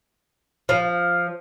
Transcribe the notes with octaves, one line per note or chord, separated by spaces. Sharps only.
F3